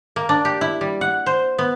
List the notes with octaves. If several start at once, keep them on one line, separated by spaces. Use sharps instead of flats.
A#3
D4
G4
E4
G3
F#5
C5
B3